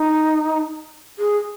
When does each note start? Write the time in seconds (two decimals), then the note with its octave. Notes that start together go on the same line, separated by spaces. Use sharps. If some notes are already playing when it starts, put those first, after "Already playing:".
Already playing: D#4
1.19 G#4